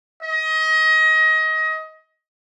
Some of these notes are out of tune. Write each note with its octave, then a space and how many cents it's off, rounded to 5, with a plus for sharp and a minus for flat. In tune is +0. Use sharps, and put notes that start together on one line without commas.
D#5 +25